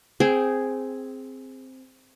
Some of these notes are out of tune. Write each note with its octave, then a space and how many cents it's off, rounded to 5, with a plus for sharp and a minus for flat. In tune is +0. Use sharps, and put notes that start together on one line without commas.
C4 +0 G#4 +0 G5 -20